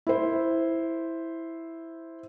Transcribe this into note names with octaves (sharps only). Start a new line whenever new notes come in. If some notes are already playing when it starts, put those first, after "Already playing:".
E4 C5